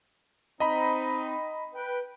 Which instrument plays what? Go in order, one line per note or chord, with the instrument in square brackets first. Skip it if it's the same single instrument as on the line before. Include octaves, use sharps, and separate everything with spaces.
[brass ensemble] C4 D#4 [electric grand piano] D#5 A#5 B5
[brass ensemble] B4 G5